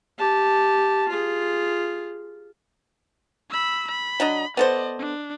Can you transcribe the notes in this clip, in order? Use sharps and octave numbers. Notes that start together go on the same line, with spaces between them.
G4 A5
F4 G#4
B5 E6
B5
F#3 D4 D#5
B3 A4 C5 D5 D#5
D4